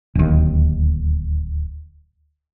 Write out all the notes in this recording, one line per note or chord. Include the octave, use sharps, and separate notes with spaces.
D1 D#2